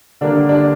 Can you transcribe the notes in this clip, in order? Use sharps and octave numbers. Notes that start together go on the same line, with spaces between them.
D3 G3 A#3 D4
D4